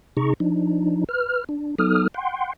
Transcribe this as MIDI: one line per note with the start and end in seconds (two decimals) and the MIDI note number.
0.17 0.34 48
0.17 0.34 63
0.17 0.34 68
0.17 0.34 82
0.17 0.34 85
0.40 1.04 53
0.40 1.04 62
0.40 1.04 63
1.09 1.44 71
1.09 1.44 89
1.49 1.75 62
1.79 2.08 54
1.79 2.08 59
1.79 2.08 63
1.79 2.08 69
1.79 2.08 87
1.79 2.08 89
2.14 2.53 78
2.14 2.53 79
2.14 2.53 84